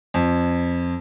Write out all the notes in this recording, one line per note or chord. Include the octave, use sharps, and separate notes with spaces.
F2